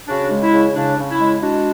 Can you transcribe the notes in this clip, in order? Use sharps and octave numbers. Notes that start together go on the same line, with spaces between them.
C#3 D4 F#4
G#3
E4
C#3
C#3 D4
C#3
E4
G#3
G#3 D4 F#4